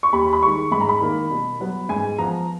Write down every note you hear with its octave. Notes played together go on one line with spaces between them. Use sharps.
C#6
D#2 B5
B5
D#3 G#3 C#6
G#2 B5
A#5
B5
D#3 A#3
B2
F#3 B3
G#2 G#5
F3 B3 A#5